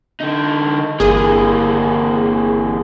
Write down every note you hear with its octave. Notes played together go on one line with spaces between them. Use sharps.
D3 D#4
G1 E3 A#3 G#4